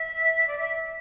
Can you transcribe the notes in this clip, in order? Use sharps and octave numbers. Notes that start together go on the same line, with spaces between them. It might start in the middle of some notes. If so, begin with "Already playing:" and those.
Already playing: E5
D5
E5